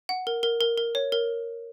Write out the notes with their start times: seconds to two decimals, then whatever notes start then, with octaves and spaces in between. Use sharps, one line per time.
0.09 F#5
0.27 A#4
0.43 A#4
0.61 A#4
0.78 A#4
0.95 C#5
1.12 A#4